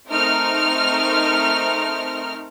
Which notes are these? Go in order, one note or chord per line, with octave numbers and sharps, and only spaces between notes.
A3 C4 D#4 A#4 F6